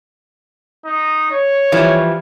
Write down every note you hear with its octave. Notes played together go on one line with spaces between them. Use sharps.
D#4
C#5
E3 F3 G3